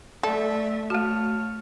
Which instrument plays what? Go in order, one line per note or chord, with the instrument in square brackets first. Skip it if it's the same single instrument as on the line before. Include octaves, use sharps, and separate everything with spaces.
[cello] A3 E5 [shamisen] A4 [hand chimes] D5
[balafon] A3 F#4 [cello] C#5 [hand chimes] A5 F6